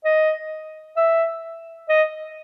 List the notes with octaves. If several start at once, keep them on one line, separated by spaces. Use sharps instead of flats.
D#5
E5
D#5